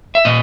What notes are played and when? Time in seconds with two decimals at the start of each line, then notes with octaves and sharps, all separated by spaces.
0.15 E5
0.25 A#2 D#5